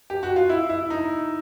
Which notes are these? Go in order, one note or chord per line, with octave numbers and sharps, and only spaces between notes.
G4
F#4
F4
E4
E4
D#4